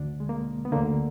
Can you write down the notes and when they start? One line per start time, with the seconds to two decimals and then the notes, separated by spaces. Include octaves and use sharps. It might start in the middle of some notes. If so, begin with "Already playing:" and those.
Already playing: D2 D3 D4
0.20 G#3
0.29 A#3
0.65 B3
0.72 D2 D3 A#3